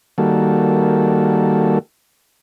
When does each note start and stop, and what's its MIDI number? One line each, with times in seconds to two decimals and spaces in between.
0.18 1.79 51
0.18 1.79 55
0.18 1.79 58
0.18 1.79 66
0.18 1.79 69